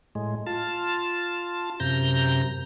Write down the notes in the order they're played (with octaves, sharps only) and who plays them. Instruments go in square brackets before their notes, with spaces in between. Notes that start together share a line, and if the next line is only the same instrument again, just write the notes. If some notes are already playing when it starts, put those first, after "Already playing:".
[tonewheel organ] A2 G#3
F4 A5
F#2 C3 A#5 G6